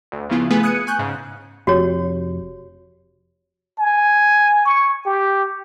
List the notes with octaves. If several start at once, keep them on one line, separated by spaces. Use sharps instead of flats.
D2
C#3 F3 B3 E4 F4
A3 B3 F4 G#4 B4 G#5
D#6 F#6 G#6 C#7 D#7
G#5 C#6 F#6 G6
G#2 C#3
F1 F#4 G4 C#5
G#5
C#6
G4